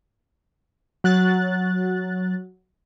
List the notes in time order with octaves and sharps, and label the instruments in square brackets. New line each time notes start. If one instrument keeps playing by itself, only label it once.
[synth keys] F#3 F#6 A6